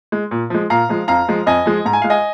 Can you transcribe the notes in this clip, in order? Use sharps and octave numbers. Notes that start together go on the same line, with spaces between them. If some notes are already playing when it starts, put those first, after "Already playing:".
G#3
A#2
F3 G#3
A#2 F5 A#5
F3 G#3
F2 F5 A#5
F3 G#3
F2 D#5 G#5
F3 G#3
G#2 A#5
G#5
G#3 F5
D#5 G#5